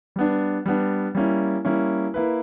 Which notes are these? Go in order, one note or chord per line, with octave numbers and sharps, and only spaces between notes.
G3 B3 D4
G3 B3 D4
G3 A#3 C#4 E4
G3 A#3 C#4 E4
A#3 E4 B4